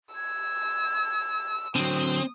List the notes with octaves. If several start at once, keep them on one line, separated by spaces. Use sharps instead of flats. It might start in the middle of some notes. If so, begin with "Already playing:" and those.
E6 G#6
D3 F#3 C4 D#6